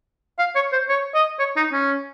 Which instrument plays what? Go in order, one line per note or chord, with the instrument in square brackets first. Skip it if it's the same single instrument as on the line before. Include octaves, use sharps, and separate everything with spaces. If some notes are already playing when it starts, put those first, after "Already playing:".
[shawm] F5
C#5
C5
C#5
D#5
C#5
D#4
C#4